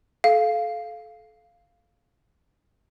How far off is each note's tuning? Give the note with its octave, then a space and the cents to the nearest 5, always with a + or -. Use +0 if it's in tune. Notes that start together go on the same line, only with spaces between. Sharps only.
A4 -25 F5 +0